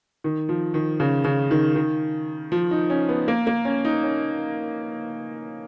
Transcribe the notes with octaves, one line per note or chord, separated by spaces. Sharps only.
D#3
F3
D#3
C#3
C#3
D#3
D#3
F3
D#4
C#4
B3
A#3
A#3
C#4
D#4
C#4